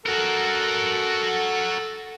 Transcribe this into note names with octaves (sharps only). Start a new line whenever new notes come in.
F#4 A4 A#4